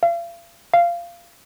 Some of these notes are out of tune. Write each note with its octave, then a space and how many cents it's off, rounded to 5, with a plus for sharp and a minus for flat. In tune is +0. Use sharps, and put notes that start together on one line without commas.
F5 -40
F5 -15